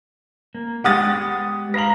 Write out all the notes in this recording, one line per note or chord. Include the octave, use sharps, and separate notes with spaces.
A#3
G#3 B3 G4 F#5 D#6 A6
B4 F5 A#5 A#6 F#7